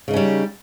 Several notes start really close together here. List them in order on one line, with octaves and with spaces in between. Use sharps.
C#3 D#4 C#4 G3